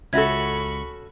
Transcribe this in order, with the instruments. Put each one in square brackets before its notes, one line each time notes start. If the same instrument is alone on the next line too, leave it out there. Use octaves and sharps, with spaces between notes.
[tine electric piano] C#2 [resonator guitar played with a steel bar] C#4 F#4 A4 [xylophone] E5 G#6 [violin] B5 C#6